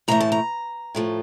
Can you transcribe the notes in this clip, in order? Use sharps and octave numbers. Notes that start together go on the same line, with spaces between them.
A2 E3 A3 A#5
A5
A#5
A2 F3 A3